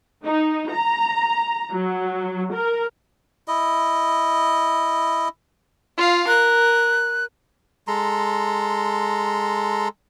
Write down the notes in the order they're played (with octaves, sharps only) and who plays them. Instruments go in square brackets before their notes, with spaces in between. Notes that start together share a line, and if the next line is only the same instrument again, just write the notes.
[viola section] D#4
A#5
F#3
A#4
[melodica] E4 D#5
[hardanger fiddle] F4 F5
[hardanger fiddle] A#4 [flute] F#6
[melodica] G#3 A4 A#5 C6